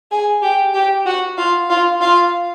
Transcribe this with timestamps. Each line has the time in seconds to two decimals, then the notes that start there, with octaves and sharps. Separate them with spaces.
0.11 G#4 G#5
0.42 G4 G5
0.74 G4 G5
1.06 F#4 F#5
1.38 F4 F5
1.69 F4 F5
2.01 F4 F5